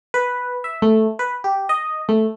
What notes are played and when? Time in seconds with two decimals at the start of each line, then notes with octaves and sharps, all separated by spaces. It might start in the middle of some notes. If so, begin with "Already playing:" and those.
0.14 B4
0.64 E5
0.82 A3
1.19 B4
1.44 G4
1.69 D#5
2.09 A3